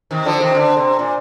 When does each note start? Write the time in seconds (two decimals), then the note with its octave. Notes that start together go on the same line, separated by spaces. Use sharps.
0.11 C3 D#3
0.25 D3 F3
0.40 C3 D#3
0.55 D3
0.77 C3
0.99 A#2